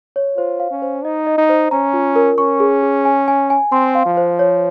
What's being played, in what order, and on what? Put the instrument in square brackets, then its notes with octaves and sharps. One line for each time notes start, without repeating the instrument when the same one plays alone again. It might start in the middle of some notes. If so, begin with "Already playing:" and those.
[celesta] C#5
[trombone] F4 [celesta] C5
[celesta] F5
[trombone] C#4
[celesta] C5
[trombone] D#4 [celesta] D#5
[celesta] D#5
[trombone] D#4
[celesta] C5
[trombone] C#4 [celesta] A#5
[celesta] F4
A#4
[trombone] C#4 [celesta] C#6
[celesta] G#4
G#4
G#5
G#5
G#5
[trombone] C4 [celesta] C6
[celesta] F5
[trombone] F3
[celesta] C5
C#5